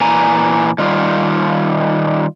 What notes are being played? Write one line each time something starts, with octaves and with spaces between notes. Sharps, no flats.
A#2 E3 G#5 A#5
D#3 G3 F4